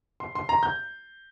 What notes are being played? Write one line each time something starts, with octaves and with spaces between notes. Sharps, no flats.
C6
C6
A#5
G6